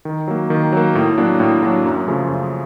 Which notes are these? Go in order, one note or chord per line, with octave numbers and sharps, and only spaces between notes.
D#3
F#3 A#3
D#3
F#3 A#3
A2
F#3 A#3 D4
A2
F#3 A#3 D4
F#2
C#3 F3 A3 C#4
F#2